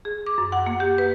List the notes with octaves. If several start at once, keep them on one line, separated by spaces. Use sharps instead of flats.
G#4
D6
F#2
F#5
A#3
G4
B4